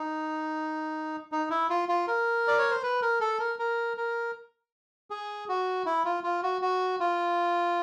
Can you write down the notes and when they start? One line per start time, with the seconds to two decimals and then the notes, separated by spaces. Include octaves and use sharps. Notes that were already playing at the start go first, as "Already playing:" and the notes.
Already playing: D#4
1.32 D#4
1.50 E4
1.70 F4
1.89 F4
2.07 A#4
2.48 D5
2.58 C#5
2.71 C5
2.83 B4
3.02 A#4
3.21 A4
3.40 A#4
3.59 A#4
3.97 A#4
5.10 G#4
5.49 F#4
5.86 E4
6.05 F4
6.24 F4
6.43 F#4
6.62 F#4
7.00 F4